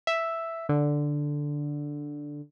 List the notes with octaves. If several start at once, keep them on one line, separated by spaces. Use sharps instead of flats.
E5
D3